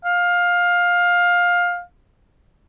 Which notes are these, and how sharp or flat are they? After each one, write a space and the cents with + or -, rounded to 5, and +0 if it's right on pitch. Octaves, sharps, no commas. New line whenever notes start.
F5 +15